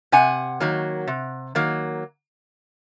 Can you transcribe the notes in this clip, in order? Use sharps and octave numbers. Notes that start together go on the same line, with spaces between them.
C3 F#5 G#5
D#3 F#3 A#3
C3
D#3 F#3 A#3